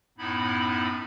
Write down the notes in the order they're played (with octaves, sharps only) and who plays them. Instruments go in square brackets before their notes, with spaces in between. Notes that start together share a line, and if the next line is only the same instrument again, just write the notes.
[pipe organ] F#2 A2 B3 D#4 E4 B5